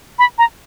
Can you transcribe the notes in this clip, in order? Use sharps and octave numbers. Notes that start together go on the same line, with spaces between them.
B5
A#5